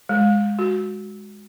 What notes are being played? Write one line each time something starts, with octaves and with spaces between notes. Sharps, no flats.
G#3
F#4